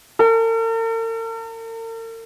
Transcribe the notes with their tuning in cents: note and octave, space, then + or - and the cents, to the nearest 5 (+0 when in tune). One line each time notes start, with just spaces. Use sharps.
A#4 -45